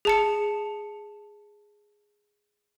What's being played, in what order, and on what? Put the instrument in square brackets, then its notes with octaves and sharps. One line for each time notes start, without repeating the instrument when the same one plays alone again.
[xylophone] G#4 A5 C#7